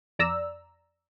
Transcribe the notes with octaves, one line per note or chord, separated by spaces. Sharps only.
F2 D5 A#5 E6